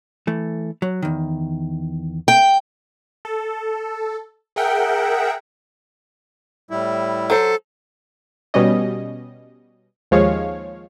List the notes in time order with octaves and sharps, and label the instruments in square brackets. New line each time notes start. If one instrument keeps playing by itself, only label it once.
[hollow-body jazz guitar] E3 A3
F#3
E2 D#3
[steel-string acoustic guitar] G5
[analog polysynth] A4
G#4 A#4 E5 F#5 G5
[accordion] A2 G3 E4
[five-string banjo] F#3 C5 [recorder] A4
[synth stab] B2 G3 C#4 D#5
D#2 F3 G#3 C#5 F5